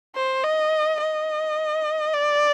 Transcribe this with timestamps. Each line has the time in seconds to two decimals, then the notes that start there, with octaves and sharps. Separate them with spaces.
0.15 C5
0.44 D#5
1.00 D#5
2.14 D5